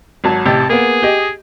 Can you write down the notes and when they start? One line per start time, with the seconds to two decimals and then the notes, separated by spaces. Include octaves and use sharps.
0.24 G#1 F#3 A5
0.46 A1 C3 G4 A5
0.69 A#3 B3 G#4
1.03 G4 D#5